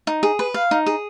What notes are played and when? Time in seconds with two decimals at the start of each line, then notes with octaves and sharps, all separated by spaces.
0.07 D#4
0.23 G#4
0.39 B4
0.54 F5
0.71 D#4
0.86 G#4